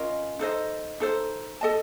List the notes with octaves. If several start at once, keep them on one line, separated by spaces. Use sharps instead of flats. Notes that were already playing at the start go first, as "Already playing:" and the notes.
Already playing: C#4 F4 A#4 D#5
D#4 A4 C5 D#5
D#4 A4 C5
A4 D#5 A5